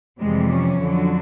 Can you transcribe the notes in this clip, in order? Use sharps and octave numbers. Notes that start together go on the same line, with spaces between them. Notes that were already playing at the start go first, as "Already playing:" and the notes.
F2 C3 E3 G3 G#3
C#4
F2 D3 F#3